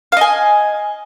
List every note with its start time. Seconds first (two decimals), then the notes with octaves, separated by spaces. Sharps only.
0.12 F5
0.17 D#5
0.21 G#5